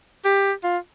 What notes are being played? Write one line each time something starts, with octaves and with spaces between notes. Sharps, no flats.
G4
F4